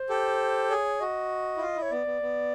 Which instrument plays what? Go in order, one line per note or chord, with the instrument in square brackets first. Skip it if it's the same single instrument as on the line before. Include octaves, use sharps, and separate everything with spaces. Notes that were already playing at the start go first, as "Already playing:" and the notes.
Already playing: [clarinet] C5
[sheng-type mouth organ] G4 A4
[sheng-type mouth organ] G#4 [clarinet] C#5
[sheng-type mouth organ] F#4 [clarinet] D#5
[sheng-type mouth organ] E4
F4
E4
[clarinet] C#5
[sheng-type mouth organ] B3 [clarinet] D5
[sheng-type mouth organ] B3
B3